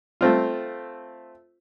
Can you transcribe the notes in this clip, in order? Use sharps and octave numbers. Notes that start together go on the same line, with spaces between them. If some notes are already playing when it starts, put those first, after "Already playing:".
A3 C4 F4